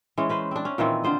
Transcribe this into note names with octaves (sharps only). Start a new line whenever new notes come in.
E3 G#3 C#4
C#4 B4 C5
C4 D4
C#4
A#2 D#3 E3 C4
D3 F4 C5 D#5